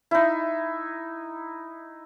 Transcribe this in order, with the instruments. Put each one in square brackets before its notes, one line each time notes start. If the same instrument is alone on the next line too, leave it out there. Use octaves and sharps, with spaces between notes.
[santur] D#4 E4